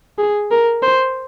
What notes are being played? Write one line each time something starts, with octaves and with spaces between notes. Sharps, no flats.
G#4
A#4
C5